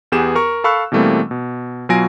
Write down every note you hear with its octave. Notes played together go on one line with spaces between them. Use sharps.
E2 B3 G4 G#4 E7
A#4 C#6
A4 F5 B5 C#6 E6 F#6
B2 E3 G3 A3 A#3 C4
B2
B2 F#3 F4 G#5 A#6 D7